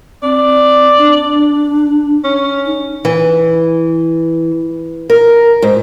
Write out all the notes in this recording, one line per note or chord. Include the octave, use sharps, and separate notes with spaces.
C4 D5
D4
C#4
D#4
E3
A#4
G#2